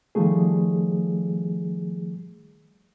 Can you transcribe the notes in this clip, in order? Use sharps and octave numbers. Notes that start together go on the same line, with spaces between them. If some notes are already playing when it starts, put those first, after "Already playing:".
D#3 F3 G3 A3 G#4